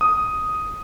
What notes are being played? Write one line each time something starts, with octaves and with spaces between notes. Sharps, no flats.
D#6